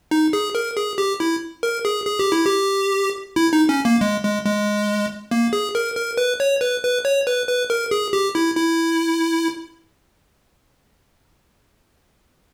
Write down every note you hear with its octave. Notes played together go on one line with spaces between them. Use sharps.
D#4
G#4
A#4
G#4
G4
E4
A#4
G#4
G#4
G4
E4
G4
E4
D#4
C#4
A#3
G#3
G#3
G#3
A#3
G#4
A#4
A#4
B4
C#5
B4
B4
C#5
B4
B4
A#4
G#4
G4
E4
E4